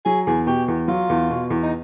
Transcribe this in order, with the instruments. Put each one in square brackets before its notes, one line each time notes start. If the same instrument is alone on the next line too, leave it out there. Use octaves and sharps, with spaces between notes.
[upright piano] F#3 [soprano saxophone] G#4
[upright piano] E2 [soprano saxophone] G#4
[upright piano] B2 [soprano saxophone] G4
[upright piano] E2
[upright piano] F#3 [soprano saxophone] F4
[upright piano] E2
B2
E2
[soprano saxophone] D#4